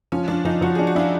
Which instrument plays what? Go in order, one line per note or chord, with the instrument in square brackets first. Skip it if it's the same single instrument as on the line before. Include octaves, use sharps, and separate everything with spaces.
[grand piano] F3 [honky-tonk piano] C#4
[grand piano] F3 [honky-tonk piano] D4
[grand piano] F3 [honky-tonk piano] D#4
[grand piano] F3 [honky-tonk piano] F#4
[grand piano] D4 [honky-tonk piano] G#4
[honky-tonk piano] F#4
[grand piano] D4 [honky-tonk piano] E4
[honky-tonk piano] F4